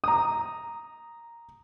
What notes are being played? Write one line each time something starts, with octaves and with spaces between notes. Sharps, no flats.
A#5 D#6